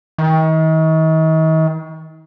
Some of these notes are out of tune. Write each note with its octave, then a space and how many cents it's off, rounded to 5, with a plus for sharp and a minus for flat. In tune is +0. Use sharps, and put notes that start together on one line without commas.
D#3 +40